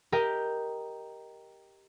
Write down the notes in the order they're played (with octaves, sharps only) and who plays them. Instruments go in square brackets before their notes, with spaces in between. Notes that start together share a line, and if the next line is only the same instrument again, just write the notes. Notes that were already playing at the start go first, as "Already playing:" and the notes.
[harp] G4 A#4 D#5 G5